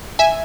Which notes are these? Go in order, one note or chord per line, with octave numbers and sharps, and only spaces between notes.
E5 G#5